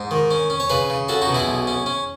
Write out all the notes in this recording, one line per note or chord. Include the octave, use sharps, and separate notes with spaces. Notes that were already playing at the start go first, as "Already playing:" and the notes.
Already playing: G#2
D#3
C#4
C#4
C#5
C#3 G#4 B4
C#3
C#4 F#4 A4
D#4 F#4
B2
E4 G#4
B1
C#4
C#4